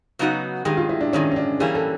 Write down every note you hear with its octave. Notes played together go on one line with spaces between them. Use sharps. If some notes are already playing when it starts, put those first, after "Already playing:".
C#3 F#3 B3 D#4 F#4
G2 D#3 G#3 G4
F4
E4
D4
G2 D#3 G#3 C#4
C#4
D4
E3 G3 A#3 C#4 G#4
A4